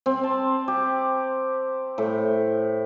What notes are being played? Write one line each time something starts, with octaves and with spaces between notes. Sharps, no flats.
C4
A5
G4
A2